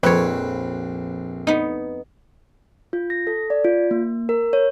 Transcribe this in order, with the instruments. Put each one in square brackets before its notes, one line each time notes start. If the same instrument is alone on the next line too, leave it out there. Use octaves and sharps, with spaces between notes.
[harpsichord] A#1 C4 B4 [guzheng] F2 C#5
[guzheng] B3 D#4
[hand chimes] F4
A#6
A4
D5
F4
A#3
A#4
C#5